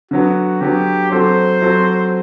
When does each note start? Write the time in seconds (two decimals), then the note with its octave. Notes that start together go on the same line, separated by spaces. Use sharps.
0.11 D3 F#3 B3 F#4
0.61 D3 F#3 B3 G4
1.11 F#3 C4 F#4 A4 C5
1.62 F#3 C4 F#4 A4